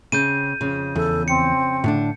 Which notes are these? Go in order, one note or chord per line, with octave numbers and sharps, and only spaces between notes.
C#3 C4 G6 D#7
F2 C#3
E2 A4
C4 C#7
A2 D3 D4